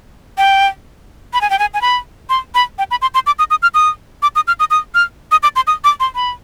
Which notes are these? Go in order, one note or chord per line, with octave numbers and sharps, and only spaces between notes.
G5
B5
G#5
G5
G#5
G#5
B5
C6
B5
G5
B5
C6
C6
D6
D#6
D#6
F6
D#6
D6
D#6
F6
D#6
D#6
F6
D#6
D6
C6
D#6
D6
C6
B5